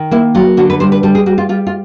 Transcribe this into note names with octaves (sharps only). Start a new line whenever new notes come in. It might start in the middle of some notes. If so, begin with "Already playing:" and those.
Already playing: D#3
A#3 E4
F#3 F4
D3 F#4
B4
G3 C5
B4
G3 A4
G#4
G3 F#4
F4
G3 F4
F4